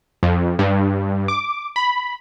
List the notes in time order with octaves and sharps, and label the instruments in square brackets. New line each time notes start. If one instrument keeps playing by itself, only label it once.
[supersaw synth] F2
G2
D6
B5